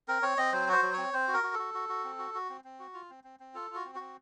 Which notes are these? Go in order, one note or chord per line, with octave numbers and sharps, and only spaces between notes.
C4 A#4
C4 C#5
C4 D#5
F#3 C5
F#4 C5
F#3
C4 C#5
C4 C5
F#4
A#4
F#4
A4
F#4
F#4
F#4
C4
F#4
F#4
C4
C4
F#4
F4
C4
C4
C4
F4 A4
F4 F#4
C4
C4 F#4